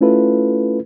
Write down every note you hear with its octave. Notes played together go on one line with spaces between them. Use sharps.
A3 C#4 E4 F4 A4 B4